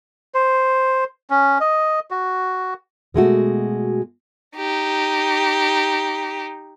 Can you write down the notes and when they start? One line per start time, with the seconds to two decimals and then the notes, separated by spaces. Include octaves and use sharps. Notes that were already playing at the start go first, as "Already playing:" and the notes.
0.34 C5
1.30 C#4
1.61 D#5
2.11 F#4
3.14 B2 G#3 A3 F#4
4.57 D#4 G4